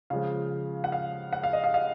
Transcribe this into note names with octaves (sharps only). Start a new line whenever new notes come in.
C#3 F3 G#3 F5
F#5
F5
F#5
F5
D#5
F5
F5